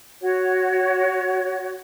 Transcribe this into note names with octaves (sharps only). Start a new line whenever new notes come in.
F#4 C#5